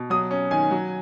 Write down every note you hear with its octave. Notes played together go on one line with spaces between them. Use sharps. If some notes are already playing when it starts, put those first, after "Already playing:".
Already playing: B2
F#3 D#6
C#4
D#3 G#5
F#3